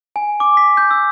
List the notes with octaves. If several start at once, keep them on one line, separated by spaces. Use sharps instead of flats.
G#5
D6
B6
G6
E6